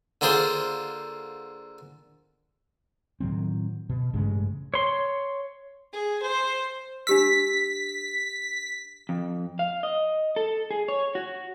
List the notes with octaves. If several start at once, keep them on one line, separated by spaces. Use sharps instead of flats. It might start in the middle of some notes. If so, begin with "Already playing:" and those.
D3 A#3 F4 G#4 C5
A2 D#3 F#3 C4
B2
A1 G2 C#3 G#3
C#5 C6
G#4
C5
D4 G4 E6 B6
F2
F5
D#5
A4
G#4
C#5
F#4